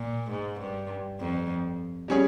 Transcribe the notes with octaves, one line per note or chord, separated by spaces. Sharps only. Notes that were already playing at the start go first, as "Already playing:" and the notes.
Already playing: A#2
G#2
G2
F2
G3 C#4 G#4 C#5